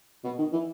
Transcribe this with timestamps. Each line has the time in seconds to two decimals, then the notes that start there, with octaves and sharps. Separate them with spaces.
0.24 B2
0.38 D#3
0.52 E3